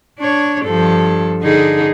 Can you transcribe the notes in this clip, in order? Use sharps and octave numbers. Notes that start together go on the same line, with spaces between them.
D4 C#5
G2 F3 A4
D3 D#4 G#4